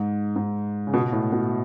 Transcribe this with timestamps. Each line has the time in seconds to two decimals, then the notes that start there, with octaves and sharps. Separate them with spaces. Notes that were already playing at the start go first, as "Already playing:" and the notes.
Already playing: G#2
0.36 G#2
0.87 C#3
0.93 B2
1.12 A2
1.32 B2